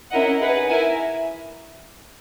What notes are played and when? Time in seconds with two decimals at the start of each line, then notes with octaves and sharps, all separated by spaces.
0.10 C#4 E4 A#4 D#5 F#5
0.39 D#4 G#4 B4 F#5
0.67 E4 A#4 E5 G#5